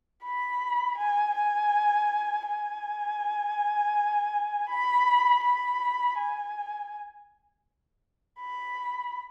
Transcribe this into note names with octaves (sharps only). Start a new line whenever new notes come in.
B5
G#5
G#5
G#5
B5
B5
G#5
B5